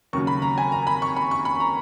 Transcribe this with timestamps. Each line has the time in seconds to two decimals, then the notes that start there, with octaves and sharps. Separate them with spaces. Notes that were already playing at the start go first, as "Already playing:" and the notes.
0.13 D#2 C#3 F#3 C#6
0.27 B5
0.42 A#5
0.58 G#5
0.72 A#5
0.87 B5
1.02 C#6
1.16 B5
1.31 C#6
1.45 B5
1.60 A#5